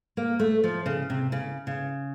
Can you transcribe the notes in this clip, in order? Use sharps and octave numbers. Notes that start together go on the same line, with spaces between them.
A#3
A3
F3
C#3
C3
C#3
C#3